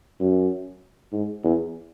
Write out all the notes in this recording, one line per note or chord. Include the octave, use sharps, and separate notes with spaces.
F#2
G#2
E2